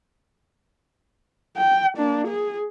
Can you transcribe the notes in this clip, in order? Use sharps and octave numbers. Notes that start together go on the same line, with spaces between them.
G5
A#3 D4
G#4